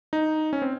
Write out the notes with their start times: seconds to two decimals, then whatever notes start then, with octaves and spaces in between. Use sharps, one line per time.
0.13 D#4
0.53 C#4
0.62 C4